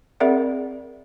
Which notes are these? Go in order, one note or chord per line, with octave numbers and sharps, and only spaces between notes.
C4 G#4 A#4 D5 E5 F#5